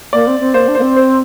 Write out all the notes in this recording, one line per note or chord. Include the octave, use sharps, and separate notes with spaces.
A#3 D5
C4
C4
A#3 C5
D4
C5
A#3
C4
C5